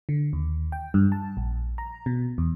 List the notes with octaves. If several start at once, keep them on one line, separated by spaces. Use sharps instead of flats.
D3
D#2
G5
G2
A5
A#1
A#5
B2
E2